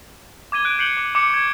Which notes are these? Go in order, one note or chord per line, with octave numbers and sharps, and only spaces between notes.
D6 G#6 D#7 G7
F#6 D7
F#6 G6 C7 C#7 F#7 G7
D6
D6 C#7
C#6 G#6